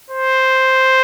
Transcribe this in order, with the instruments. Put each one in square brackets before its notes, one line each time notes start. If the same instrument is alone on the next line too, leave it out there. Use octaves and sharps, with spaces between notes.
[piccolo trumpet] C5